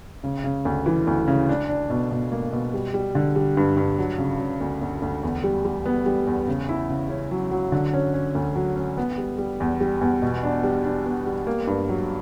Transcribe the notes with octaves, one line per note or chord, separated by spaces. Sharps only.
C#3
C#3
D2
E3
D2
C#3
D4
D4
B2
B2
A#3
B2
G3
G3
D3
G3
G2
G2
F#3
C#3
C#3
D2
D2
D2
E2
G3
G3
B3
G3
E2
C#3
E4
C#3
C#4
F#3
F#3
D3
C#4
C#4
D2
F#3
C#4
B3
G3
G3
E2
G3
E2
B2
D4
G3
D4
B3
G3
A#3
G2
F#3